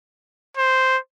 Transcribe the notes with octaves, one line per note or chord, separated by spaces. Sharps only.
C5